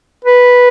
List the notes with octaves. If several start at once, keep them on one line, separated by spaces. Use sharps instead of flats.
B4